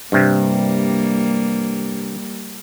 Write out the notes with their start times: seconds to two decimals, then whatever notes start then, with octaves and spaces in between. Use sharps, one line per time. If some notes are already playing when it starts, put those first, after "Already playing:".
0.12 G2 C3 G3 A#3